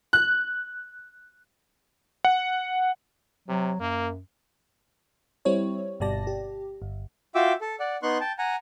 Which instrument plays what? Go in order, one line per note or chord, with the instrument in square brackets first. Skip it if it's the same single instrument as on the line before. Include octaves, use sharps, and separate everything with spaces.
[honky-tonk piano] F#6
[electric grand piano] F#5
[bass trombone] C3 [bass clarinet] F#3
[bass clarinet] F#2 [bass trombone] A#3
[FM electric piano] G3 C4 E4 C#5
G1 B2 G3 D5 A5 A#6
G4
G1
[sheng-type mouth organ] F4 F#4 E5 G5 D6 E6
A4
D5 F#5
B3 D#4 C6 C#6 F#6
G5 A5
F#5 G#5 A#5